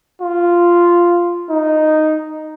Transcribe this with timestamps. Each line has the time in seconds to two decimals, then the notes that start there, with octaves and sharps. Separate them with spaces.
0.21 F4
1.50 D#4